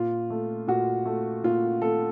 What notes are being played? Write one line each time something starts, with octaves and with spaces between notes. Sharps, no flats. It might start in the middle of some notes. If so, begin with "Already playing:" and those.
Already playing: A#2 F4
A3
A#2 F#4
A3
A#2 F4
A3 A4